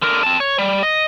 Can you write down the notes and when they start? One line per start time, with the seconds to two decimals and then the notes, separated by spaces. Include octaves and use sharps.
0.02 D3 A#4
0.23 C4 A5
0.40 C#5
0.58 G3
0.83 D#5